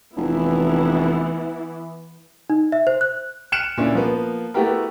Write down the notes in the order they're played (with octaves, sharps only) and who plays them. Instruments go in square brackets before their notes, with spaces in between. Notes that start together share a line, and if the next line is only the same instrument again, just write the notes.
[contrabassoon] F1 [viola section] E3 B3 E4
[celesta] D#4
E5
C5
F#6
[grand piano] F6 F#6 C#7 D7 E7
A#2 C#4 D4 E4
F3 A#3 B3
A3 B3 E4 F#4 G4 A#4